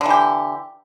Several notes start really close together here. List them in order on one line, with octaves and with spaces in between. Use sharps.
D3 E3 G4